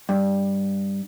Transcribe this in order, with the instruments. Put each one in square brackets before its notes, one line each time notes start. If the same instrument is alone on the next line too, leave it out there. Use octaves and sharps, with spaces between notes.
[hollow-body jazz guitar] G2